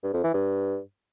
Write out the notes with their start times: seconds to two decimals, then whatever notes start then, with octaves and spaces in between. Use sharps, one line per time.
0.03 G2
0.14 F2
0.24 E3
0.34 G2